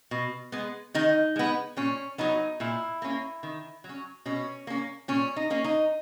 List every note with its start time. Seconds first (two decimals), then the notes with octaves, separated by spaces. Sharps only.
0.11 B2
0.52 G#3 B3
0.94 D#3 D#4
1.36 G#3 B3
1.77 A#2 C#4
2.18 F#3 B3 D#4
2.60 A#2 E4
3.02 A#3 C#4
3.43 D#3
3.84 F#3
3.89 C#4
4.26 B2 C#4
4.67 A#3 C#4
5.08 A#2 C#4
5.36 D#4
5.50 A#3 C#4
5.64 D#4